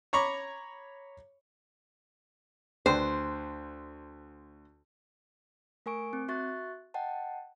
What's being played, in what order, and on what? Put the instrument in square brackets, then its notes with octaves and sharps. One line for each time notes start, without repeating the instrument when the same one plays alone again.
[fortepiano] C#5 A#5 B5 C#6 D6
[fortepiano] D2 B4 G5 [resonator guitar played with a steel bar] C5
[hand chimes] A3 A#4 G#5 C#6 D7
C4
F#4 E5 C#6 F#6 A6
D#5 F#5 G5 A5